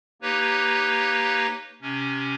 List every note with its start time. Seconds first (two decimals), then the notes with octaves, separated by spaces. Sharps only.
0.22 A#3 D#4 G4 B4 C#5
1.82 C3 C#4